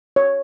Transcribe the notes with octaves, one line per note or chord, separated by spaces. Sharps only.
C#5